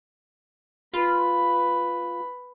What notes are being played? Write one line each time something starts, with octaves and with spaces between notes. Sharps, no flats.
F4 B4 B5